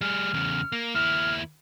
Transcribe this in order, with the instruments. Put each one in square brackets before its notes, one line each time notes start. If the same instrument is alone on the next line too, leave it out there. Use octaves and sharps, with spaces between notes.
[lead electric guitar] G3 G#4 [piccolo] F6
[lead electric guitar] E2 C#3
A#3
[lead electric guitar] D#2 E4 [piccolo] F6